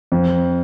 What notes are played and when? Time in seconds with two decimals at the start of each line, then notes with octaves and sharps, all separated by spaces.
0.12 F2